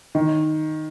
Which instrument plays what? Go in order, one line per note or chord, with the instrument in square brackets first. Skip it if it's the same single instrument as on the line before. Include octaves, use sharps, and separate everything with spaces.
[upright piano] D#3